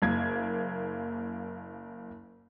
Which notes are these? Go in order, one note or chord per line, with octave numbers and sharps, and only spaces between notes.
F#1 A#3 G#6